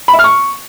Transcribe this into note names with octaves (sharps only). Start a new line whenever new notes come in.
B5
E5
F6
C#6